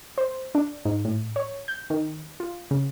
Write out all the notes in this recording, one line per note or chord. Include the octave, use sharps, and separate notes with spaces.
C5
D4
G#2
A2
C#5
G6
D#3
F4
C#3